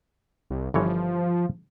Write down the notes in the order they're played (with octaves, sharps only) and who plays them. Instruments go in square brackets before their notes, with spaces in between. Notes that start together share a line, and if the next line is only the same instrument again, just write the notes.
[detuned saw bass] C2
[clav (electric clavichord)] G1 E3 C#5 [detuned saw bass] F3